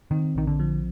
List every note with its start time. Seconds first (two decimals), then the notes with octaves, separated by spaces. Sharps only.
0.11 D#3 C4
0.35 A#1 D#3
0.47 D3
0.59 F3